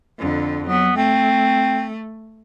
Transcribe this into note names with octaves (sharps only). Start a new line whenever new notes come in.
F2 D3
F#3 B3
A3 C4